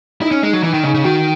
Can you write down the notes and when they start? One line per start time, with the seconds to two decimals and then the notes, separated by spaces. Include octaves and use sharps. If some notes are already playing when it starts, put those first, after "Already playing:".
0.22 D#4 E4
0.31 C#4
0.42 G#3 D#4
0.53 F#3
0.63 E3 D#4
0.74 D#3
0.83 C#3 D#4
0.94 C#3
1.04 D#3 F#4